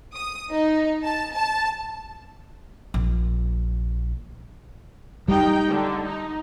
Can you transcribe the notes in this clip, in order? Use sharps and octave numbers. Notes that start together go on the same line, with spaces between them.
D#6
D#4
A5
A5
A#1
G3 D#4 G5
D3
D#4